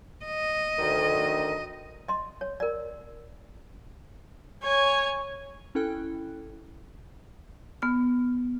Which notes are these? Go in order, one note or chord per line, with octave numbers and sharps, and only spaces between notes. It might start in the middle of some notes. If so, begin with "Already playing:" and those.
D#5
D2 D#3
D#5 C6
C#5
A#4 D5
C#5 G#5
C#4 E4 A4 G5 F#6
B3 F6